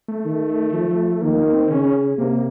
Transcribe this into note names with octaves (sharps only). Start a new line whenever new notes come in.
A3
D#3
F3
D#3 A#3
A#3
C4
C#3 C#4
C3 A#3